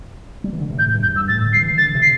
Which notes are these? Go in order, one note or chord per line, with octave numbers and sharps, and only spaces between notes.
G3
E3
D3
C3
A2 G6
G2
E2 G6
G2 E6
A2 A6
D3
G3 C7
E3
D3 A6
C3
C7